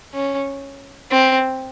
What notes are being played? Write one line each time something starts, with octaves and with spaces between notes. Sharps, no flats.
C#4
C4